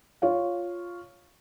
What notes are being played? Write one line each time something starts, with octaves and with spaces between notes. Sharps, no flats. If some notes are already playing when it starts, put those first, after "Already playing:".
F4 C#5 F5